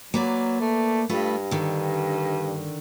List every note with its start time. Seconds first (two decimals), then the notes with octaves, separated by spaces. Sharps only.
0.14 F#3 A#3 B4 D5
0.61 A3
1.09 G2 A3 F4 B4
1.51 D3 D#3